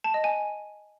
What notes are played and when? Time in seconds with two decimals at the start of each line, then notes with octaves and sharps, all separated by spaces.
0.04 A5
0.14 D#5
0.24 G#5